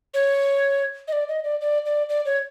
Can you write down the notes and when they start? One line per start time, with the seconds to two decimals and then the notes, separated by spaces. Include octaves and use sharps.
0.14 C#5
1.08 D#5
1.12 D5
1.29 D#5
1.44 D5
1.61 D5
1.86 D5
2.09 D5
2.26 C#5